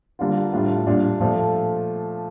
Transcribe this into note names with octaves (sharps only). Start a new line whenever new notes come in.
D3 G3 A#3 D4 F4
A2 G3 D4 F4
A#2 G3 D4
A#2 F3 A3